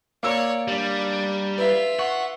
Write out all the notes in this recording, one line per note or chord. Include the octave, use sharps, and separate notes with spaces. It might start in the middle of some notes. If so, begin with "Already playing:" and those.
A#3 C#5 D5 E6
G3 D4
F4 B4 E5
F#5 C#6